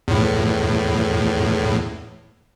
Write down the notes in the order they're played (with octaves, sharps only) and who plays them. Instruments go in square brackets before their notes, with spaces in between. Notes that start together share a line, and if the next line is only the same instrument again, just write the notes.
[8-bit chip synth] E2 A2